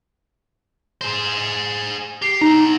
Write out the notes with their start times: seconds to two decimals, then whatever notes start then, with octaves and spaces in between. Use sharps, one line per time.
1.01 G#4 C5
2.22 G4 C7
2.41 B2 D#4 A#5